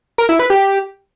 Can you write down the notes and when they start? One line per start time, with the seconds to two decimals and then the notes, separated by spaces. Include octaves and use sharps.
0.18 A#4
0.29 E4
0.39 B4
0.50 G4